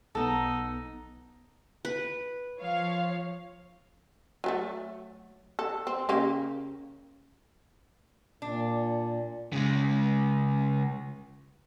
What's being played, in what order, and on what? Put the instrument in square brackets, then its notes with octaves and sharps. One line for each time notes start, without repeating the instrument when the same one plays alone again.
[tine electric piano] B1 B3 [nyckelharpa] D#4 [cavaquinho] A4 F#5
[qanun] B4
[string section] F3 C#5 F5
[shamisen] F#3 G3 A3
A4
C4
C#3 A#3 G4
[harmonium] A#2 [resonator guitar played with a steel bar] D4
[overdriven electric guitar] C#3 G#3